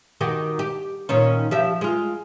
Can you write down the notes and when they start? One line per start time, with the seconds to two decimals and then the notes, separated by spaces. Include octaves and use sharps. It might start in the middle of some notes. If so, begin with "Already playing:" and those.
0.21 D#3 F#4 G4
0.59 G4
1.09 A#2 D#3 C#4
1.51 F3 G4 E5
1.81 G#3 F4